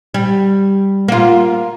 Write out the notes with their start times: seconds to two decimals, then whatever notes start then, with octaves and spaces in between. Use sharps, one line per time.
0.14 G3
1.08 A#3 F4